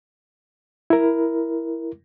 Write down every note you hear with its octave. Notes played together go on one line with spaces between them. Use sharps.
E4 A#4